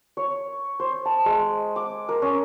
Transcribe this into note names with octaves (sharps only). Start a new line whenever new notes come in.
C#5
C5
A5
G#3
D6
A#4
C#4